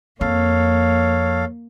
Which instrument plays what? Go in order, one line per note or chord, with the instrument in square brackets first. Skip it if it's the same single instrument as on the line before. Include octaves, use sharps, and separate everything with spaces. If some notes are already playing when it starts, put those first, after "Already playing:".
[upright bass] F2 [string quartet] A#3 [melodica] A4 F5 [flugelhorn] C#5